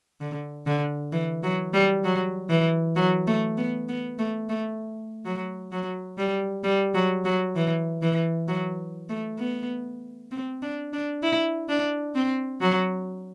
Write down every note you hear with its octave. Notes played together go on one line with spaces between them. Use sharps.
D3
D3
E3
F#3
G3
F#3
E3
F#3
A3
B3
B3
A3
A3
F#3
F#3
G3
G3
F#3
F#3
E3
E3
F#3
A3
B3
C4
D4
D4
E4
D4
C4
F#3